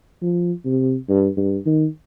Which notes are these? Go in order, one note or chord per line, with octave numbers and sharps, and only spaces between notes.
F3
C3
G2
G2
D#3